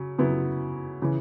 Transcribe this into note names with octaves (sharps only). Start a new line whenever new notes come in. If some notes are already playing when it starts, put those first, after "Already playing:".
Already playing: C#3 F#3
C#3 F#3 B3 E4
C#3 E3